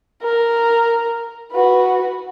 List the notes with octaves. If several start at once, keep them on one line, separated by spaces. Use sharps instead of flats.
A#4
F#4 B4